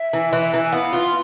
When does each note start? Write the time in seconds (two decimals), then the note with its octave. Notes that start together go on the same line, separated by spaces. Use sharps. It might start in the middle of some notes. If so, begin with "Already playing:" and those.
Already playing: E5
0.13 E3
0.33 E3 E5
0.54 E3
0.63 G#5
0.73 B3 F5
0.93 F4